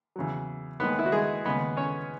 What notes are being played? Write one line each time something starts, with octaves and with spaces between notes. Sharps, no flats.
E2 C#3 F#3
D#2 D#3 G#3 B3 B4
E4
F#4
G#3 G#4
D#2 C#3 G#3 B3 B4
C#4 C#5